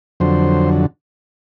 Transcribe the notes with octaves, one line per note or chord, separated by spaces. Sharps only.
F2 D3 F#3 C5